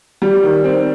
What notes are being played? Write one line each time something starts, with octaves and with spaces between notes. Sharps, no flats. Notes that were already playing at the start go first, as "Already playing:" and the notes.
G3
D#3
C4